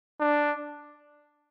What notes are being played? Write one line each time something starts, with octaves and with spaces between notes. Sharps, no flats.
D4